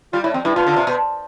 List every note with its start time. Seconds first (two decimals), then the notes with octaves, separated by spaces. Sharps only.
0.13 G3 F4
0.24 A2 E4
0.34 F2 C4
0.45 G2 E4
0.55 B2 F4
0.66 D3
0.76 C3
0.87 B2